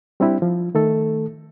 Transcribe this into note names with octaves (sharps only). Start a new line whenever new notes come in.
G3 C4 D4 E4 G4
F3
D#3 A3 A4